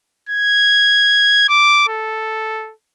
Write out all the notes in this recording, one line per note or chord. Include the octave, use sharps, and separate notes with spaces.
G#6
D6
A4